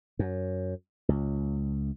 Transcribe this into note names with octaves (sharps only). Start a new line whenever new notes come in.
F#2
C#2